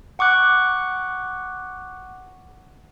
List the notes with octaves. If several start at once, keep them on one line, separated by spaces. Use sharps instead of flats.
F#5 C#6 D6 F#6